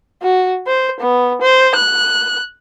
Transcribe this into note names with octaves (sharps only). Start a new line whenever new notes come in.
F#4
C5
B3
C5
F#6